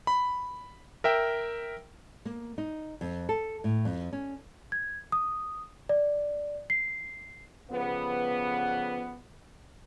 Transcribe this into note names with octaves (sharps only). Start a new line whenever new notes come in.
B5
A#4 E5 G5
A#3
D#4
F2
A4
A2
F2
C#4
G#6
D#6
D5
C7
C#3 F3 G3 A3 B3